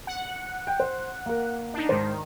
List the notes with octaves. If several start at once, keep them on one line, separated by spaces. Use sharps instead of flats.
F#5
G5
C5
A#3 A#4
D4 D#4
G#2 D#3 C5